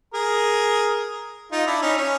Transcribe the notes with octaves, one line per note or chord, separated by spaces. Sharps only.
G#4 A#4
D#4 F4
D4 E4
C#4 D#4
C#4